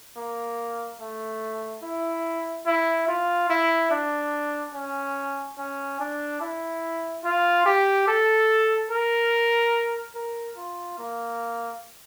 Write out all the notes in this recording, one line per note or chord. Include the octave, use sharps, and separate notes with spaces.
A#3
A3
E4
E4
F4
E4
D4
C#4
C#4
D4
E4
F4
G4
A4
A#4
A#4
F4
A#3